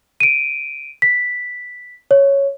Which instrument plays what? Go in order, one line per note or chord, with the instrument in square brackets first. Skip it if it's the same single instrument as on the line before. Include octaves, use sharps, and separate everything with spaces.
[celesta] D7 D#7
B6
C#5